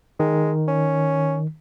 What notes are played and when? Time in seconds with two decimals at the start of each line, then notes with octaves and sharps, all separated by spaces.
0.20 D#3 G#3
0.68 C#4